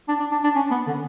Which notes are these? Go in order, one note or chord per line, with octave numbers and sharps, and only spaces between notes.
D4
D4
D4
D4
C#4
B3
D3